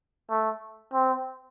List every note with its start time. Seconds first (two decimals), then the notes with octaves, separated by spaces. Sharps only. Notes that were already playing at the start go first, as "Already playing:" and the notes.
0.30 A3
0.94 C4